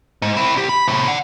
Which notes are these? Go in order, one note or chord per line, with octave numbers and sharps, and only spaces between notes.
G#2
C4 E4
C2 G4
B5
A2 C3
D5 F#5